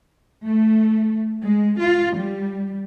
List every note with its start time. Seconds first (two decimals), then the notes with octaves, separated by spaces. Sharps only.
0.44 A3
1.44 G#3
1.79 F4
2.16 G3